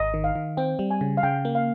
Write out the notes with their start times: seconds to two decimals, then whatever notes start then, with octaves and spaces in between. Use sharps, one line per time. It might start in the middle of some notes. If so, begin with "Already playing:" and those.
Already playing: G#1 D#5
0.14 D#3
0.24 F5
0.35 D#3
0.57 C4 G5
0.79 G3
0.91 G#5
1.01 C#3
1.17 F5
1.23 C#3 G5
1.45 A#3
1.55 F5